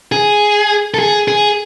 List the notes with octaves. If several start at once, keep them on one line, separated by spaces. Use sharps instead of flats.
G#4
A4
G#4
G#4